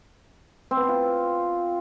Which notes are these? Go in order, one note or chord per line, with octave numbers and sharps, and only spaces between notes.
C4
B3
C4
F4